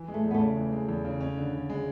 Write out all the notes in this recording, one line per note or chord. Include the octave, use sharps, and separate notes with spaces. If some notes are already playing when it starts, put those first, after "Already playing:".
Already playing: E3
G#3
A3
E2
B3
A3
C#3
E3
G#3
E2
C#3
C#4
D3
D3
G#3